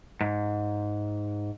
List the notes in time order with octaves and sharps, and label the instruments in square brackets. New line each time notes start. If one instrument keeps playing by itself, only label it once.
[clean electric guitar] G#2